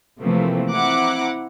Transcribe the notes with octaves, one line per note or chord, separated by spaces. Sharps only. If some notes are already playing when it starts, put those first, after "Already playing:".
C3 E3 F3 A3 A#3 C4
C4 E4 F#5 A#5 D6 F#6